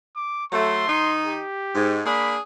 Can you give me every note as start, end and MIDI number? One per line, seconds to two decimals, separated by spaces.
0.16 0.45 86
0.52 0.84 54
0.52 0.84 57
0.52 1.14 84
0.88 1.41 51
0.88 1.41 63
1.26 2.00 67
1.75 2.01 44
2.06 2.38 58
2.06 2.38 62
2.06 2.38 68
2.06 2.35 83